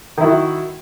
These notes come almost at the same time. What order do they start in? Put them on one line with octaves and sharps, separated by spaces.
D#3 E4 F#4